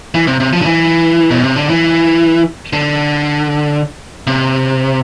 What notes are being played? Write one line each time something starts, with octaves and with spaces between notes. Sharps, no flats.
E3
C3
C3
F3
D3
E3
B2
C3
D3
E3
D3
C3